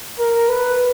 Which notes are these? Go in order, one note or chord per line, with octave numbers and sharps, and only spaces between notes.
A#4
B4